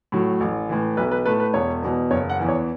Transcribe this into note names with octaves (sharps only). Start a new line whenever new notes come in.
A2 F#3
A1
A2 E3
B1 B4
B4
A2 A3 B4
B4
E1 C#5
E2 B2
F#1 C#5
F#5
E2 E3
C#5